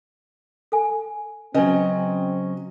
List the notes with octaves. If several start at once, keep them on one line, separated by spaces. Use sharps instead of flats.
A4 G#5
C#3 F#3 C4 C#4 B4 D#5 G#5